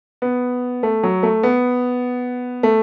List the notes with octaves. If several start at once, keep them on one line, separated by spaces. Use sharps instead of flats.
B3
A3
F#3
A3
B3
A3